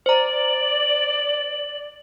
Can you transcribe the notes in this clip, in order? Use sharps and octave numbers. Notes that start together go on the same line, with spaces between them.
C5 D5 A#5 F#7